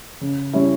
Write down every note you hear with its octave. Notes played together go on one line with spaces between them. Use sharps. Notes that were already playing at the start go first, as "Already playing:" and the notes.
C#3
G3 C#4 E4